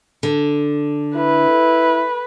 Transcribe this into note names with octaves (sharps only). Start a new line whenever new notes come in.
D3
E4 B4